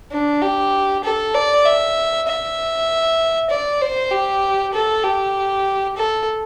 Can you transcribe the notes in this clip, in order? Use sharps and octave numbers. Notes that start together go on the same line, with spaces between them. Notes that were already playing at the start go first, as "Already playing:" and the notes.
D4
G4
A4
D5
E5
E5
D5
C5
G4
A4
G4
A4